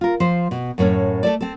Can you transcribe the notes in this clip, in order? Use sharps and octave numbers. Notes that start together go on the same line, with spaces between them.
F4 A#4
F3 C5
B2
F#2 A2 A3 C#4
A3 A4 D5
C4 A4